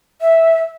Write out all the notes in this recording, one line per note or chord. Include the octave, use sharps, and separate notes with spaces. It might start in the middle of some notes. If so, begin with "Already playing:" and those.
E5